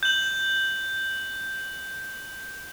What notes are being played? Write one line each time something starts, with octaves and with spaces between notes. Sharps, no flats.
G6 F#7